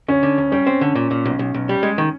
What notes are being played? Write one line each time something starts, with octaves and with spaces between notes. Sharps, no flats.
D2 C#4
D3
D2
G3 C#4
C4
D3
A#2
A#2
B1
B1
B1
G3
G#3
D#3